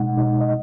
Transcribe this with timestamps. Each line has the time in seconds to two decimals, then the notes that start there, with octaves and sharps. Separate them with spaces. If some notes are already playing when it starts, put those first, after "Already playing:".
Already playing: B2 G#3 D#4 F#5
0.17 B2 G#3 D#4
0.41 D#5